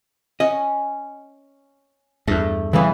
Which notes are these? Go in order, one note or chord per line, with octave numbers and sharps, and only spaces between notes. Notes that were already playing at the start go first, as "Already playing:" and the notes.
C#4 D#5
E2 G2 A3
C#3 E3 G3 B3